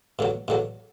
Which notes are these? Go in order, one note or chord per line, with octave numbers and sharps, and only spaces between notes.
G2 D3 F#3
G2 D3 F#3